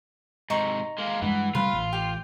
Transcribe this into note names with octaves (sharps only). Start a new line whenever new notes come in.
G#2 C3 D#4 C#6
G#3 A#3 F5
G2 E3 G#3 F#5
C3 G3 A3 F4 B4 F5
A1
G4 G5